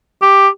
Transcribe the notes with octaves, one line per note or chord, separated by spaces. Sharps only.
G4